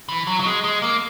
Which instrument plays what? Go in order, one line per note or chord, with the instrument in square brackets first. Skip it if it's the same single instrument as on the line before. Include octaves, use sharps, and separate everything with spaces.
[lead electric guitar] E3
F#3
F#3
G#3
G#3
A#3